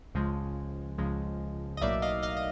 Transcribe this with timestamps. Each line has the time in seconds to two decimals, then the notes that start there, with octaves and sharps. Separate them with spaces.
0.14 C#2 C#3 F3 G#3
0.98 C#2 C#3 F3 G#3
1.77 D#5
1.81 B1 A2 F#3 A#3 D#4 D5 E5
2.02 D#5 F5
2.23 D#5 F5
2.37 D#5